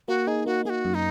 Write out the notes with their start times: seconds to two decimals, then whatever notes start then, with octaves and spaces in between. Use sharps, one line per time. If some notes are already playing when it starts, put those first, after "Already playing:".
0.08 A#3 F#4
0.27 D#4 G#4
0.46 A#3 F#4
0.65 A#3 G#4
0.70 F#4
0.85 F#2
0.95 D#4